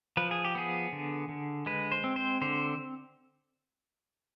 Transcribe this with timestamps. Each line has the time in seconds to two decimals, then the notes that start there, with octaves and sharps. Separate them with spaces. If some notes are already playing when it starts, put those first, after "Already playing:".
0.17 F3 B4
0.31 G#4
0.45 G4
0.55 B3 G#4
0.92 D3
1.29 D3
1.66 G#3 B4
1.92 C5
2.04 C4
2.16 C5
2.41 D3 C5